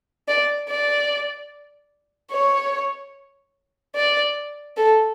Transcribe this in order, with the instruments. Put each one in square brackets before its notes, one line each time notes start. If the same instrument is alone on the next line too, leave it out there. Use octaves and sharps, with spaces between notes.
[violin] D5
D5
C#5
D5
A4